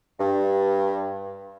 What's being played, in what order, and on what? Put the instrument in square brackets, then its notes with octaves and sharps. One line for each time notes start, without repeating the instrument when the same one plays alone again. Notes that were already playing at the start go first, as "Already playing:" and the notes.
[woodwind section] G2